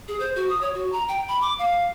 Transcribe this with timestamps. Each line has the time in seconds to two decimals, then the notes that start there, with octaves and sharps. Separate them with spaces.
0.08 G#4
0.20 C5
0.36 F#4
0.50 D#6
0.61 C#5
0.74 F#4
0.92 A#5
1.08 G5
1.28 B5
1.41 D6
1.59 F5